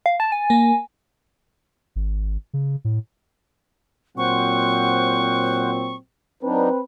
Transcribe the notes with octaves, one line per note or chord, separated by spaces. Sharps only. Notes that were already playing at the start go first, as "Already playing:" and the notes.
F5
A5 A6
G#5
A#3
G#1
C#3
A2
A#2 F#3 C4 C5 F#5 C#6
F#3 C4 D4 D#4 B4